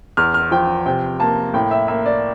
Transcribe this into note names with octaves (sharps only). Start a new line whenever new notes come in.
E2 F6
F6
F3 G5
C3 G5
A#3 A5
A2 G5
E5
A#3 E5
D5